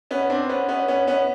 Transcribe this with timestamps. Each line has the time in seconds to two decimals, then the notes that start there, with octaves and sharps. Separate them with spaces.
0.11 B3 C#4
0.30 C4 D4
0.49 B3 C#4
0.68 B3 C#4
0.88 B3 C#4
1.07 B3 C#4